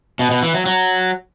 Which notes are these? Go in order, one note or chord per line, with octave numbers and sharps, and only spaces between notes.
B2
B2
E3
F#3
F#3